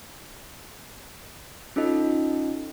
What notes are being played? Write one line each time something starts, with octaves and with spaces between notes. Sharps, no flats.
C#4 D#4 F4 A4 D#5